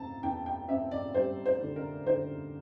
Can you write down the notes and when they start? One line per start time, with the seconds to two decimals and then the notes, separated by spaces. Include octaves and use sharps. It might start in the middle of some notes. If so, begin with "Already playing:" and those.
Already playing: E2 C4 A5 A#5
0.23 E2 G5
0.46 G5
0.69 C4 E5
0.91 D5
1.14 G3 C5
1.46 C5
1.61 D3
1.76 A#4
2.06 D3 C5